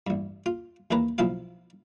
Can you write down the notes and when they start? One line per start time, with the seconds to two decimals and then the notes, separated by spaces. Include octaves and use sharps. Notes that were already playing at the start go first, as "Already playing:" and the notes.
0.07 A1 G2
0.46 F4
0.91 D#2 E3 A#3 B4 A#5
1.18 B1 F3 E4 F4 F5